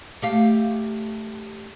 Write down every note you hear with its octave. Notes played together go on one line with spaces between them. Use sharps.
A3 G4 F5